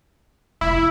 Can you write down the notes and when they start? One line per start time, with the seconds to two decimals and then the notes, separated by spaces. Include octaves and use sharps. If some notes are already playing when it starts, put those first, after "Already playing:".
0.61 F1 E4